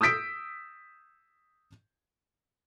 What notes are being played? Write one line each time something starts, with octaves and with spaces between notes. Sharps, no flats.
D#6 E6 G6 B6 D7